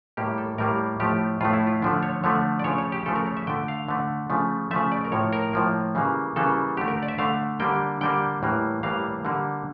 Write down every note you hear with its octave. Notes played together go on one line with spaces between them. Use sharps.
A2 G3 A#3 G4
A4
A2 G3 A#3 A#4
A2 F3 A3 G4
A2 F3 A3 F4
E4
F4
D3 F3 A3 D4
C#5
D3 F3 A3 C#5
D5
C#3 F3 A3 C#5
C#5
G4
C#3 F3 A3 A4
A#4
C#5
E5
D3 A3 G5
F5
D3 A3
C#3 F3 A3
C#3 F3 A3 E5
D5
A#4
A2 F3 A#3 C#5
A#4
A2 F3 A#3
C#3 E3 G3 A#3
C#3 E3 G3 A#3 A4
D3 A3 G4
A#4
D5
E5
D3 A3 F5
D3 G3 A#3 G5
D3 G3 A#3 G5
A2 E3 G3 A#3
A2 E3 G3 A#3 F5
D3 G3 A#3